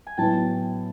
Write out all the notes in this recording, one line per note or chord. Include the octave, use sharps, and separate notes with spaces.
G#5
A2 F#3 B3 E4 G5 A5